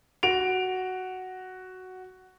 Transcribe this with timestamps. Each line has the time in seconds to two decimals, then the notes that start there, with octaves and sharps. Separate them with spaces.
0.23 F#4 D7 F7